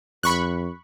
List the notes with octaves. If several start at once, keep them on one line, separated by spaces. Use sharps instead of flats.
F2 B5 C#6 F#6